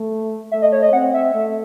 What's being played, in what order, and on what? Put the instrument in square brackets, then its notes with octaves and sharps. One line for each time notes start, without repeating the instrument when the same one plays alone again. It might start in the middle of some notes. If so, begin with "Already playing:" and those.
Already playing: [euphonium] A3
[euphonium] A3 [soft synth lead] E5
[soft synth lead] D#5
C#5
D#5
[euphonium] C4 [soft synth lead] F#5
[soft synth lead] E5
[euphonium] A3